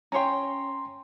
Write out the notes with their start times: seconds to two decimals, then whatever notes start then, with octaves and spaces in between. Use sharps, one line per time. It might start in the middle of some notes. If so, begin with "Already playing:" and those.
0.12 C#4 C#5 G5 A#5 C6